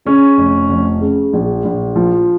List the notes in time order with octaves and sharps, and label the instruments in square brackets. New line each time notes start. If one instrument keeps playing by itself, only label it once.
[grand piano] C#3 C#4
F1
F1
C#3
A#1
A#1
F3